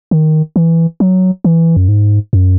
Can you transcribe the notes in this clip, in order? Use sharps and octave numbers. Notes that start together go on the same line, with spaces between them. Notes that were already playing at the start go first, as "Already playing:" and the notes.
D#3
E3
F#3
E3
F#2
G#2
F#2